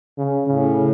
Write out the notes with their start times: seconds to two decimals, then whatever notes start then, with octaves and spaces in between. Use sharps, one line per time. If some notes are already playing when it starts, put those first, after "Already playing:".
0.18 C#3
0.47 A2 C#3